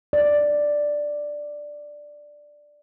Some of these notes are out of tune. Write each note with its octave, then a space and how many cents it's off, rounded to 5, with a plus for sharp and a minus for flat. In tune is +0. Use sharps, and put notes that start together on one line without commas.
D5 +5